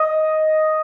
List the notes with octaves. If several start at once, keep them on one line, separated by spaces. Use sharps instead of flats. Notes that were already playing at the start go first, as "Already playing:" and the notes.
Already playing: D#5